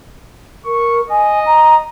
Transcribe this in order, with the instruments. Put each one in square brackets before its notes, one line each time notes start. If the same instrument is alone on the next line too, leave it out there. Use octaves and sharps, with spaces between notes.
[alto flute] A#4 [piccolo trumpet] C#6
[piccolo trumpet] D#5 [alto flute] G#5
[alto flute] A#5